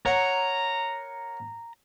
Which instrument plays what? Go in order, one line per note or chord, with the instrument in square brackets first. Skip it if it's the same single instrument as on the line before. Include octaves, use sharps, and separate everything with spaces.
[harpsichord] A#4 C#5 F#5 [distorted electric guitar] A#5